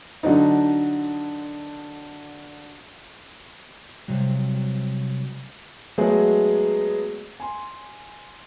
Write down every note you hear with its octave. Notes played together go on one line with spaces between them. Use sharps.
D3 F#3 D4 D#4
C3 F#3 G3
F#3 G#3 A3 B3 G#4 C#5
G#5 C6